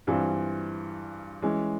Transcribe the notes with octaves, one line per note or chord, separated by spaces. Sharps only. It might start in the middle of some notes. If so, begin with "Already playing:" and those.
G2 E3 G3 C4 F4
E3 G#3 C#4